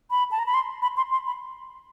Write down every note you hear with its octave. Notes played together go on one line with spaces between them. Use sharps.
B5
A5
A#5
B5
C6
B5
C6
C6
B5